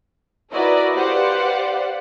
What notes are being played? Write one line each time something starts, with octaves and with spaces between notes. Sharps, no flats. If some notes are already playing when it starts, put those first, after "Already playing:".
E4 F#4 A#4 B4 D5 D#5
G4 B4 C5 D5 F5 F#5